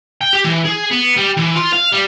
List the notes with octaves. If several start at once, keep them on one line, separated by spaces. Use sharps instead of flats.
G5
G4
E3
G#4
B3
G3
E3
F4
F5
G3